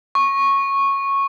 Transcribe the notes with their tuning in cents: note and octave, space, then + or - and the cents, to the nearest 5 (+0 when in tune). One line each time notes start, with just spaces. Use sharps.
C#6 -10